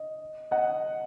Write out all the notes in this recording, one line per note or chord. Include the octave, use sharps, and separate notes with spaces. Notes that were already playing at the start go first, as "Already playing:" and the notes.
Already playing: D#5
D#5 F#5